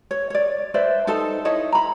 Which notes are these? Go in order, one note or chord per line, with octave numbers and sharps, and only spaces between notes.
C#5
C#5 D5
B4 C5 D5 E5
D#4 A4 C5 A5
D#4 E4 C#5 D#5
A#5 B5